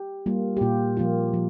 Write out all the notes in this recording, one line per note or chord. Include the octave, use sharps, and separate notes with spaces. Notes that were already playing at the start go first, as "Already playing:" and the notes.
Already playing: G4
G3 A#3 F4
G4
A#2 F4
F3 A#3 F4
F3